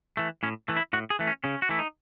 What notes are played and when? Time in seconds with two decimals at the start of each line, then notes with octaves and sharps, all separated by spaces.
0.17 E3 A3
0.43 A2 C#4
0.68 E3 A3
0.77 E4
0.93 A2 F#4
1.10 G#4
1.19 E3 A3
1.27 C#4
1.44 C#3 C#4
1.62 F#4
1.69 E3 A3 E4
1.79 D#4